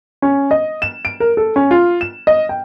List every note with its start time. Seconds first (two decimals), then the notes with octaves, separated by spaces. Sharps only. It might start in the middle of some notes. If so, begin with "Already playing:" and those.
0.22 C#4
0.51 D#5
0.82 E7
1.05 D7
1.20 A#4
1.37 A4
1.56 C#4
1.71 F4
2.01 E7
2.27 D#5
2.49 G5